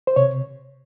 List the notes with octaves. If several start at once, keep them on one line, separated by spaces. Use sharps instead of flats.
C5
C3 C#5